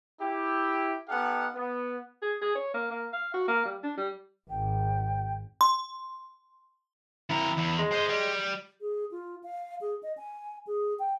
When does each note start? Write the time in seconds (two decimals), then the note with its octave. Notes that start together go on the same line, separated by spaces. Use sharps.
0.21 E4 G4
1.09 B3 D#4 G4 A4 F5 F#5
1.55 B3
2.22 G#4
2.42 G#4
2.55 C#5
2.74 A#3
2.91 A#3
3.13 F5
3.34 F#4
3.48 A#3
3.65 G3
3.83 D4
3.97 G3
4.50 G#1 G5
5.61 C6
7.30 F2 E4 A#4
7.57 E2
7.79 G#3
7.92 C5 D#5
8.09 G3
8.81 G#4
9.12 F4
9.43 F5
9.81 G#4
10.03 D#5
10.17 G#5
10.67 G#4
10.99 G5